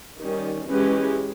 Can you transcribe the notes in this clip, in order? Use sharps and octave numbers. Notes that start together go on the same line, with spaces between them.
D#3 G3 C#4
E3 G#3 C#4 G4 B4